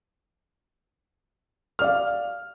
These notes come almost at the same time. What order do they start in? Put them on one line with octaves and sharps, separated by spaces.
F6 D5 F5